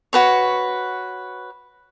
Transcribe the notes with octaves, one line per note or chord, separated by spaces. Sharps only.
F#4 B4 C#5